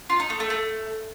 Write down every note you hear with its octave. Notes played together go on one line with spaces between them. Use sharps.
F4
D#4
A3
A3
A3